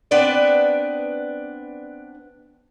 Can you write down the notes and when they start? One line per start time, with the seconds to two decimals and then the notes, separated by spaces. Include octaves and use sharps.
0.11 B3 C4 D4 B4 D5